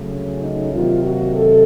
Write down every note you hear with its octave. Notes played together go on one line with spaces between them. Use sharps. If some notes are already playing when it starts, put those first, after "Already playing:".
Already playing: C#3 F#3 A3
C#4
D#4
C3 D#3 F#3 A#3 F4
F#4
A4